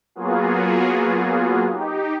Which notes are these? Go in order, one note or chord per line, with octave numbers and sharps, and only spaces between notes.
F#3 A#3 B3 F4 F#4 G#4
D#4 G4